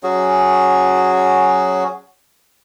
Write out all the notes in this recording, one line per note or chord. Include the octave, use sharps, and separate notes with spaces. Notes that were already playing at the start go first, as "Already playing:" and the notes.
F#3 C#4 F#4 G#4